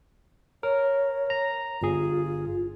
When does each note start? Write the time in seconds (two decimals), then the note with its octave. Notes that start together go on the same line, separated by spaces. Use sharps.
0.63 A#4 C#5
1.30 A#5
1.82 G1 F4 G#4